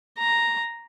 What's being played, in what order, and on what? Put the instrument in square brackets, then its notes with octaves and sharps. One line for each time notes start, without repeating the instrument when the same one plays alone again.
[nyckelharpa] A#5